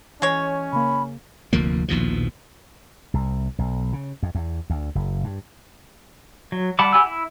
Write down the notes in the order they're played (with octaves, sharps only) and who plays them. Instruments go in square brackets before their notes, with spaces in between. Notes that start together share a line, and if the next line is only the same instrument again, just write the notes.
[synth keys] E3 [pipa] G#3 C#5 [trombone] C#4
[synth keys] C#3 A#3 [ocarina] B5
[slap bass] F1 D2 F3 A#3
A#1 D#2 B2 F3
C2
B1
C#3
F2
E2
D2
F#1
G2
[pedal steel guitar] F#3
G3 F#5 A5 B5 D6
G4 F#5 G#5 B5 E6
E4